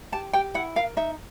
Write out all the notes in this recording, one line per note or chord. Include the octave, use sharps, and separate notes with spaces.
G4 A5
G4 G5
E4 F#5
A#4 F5
D#4 E5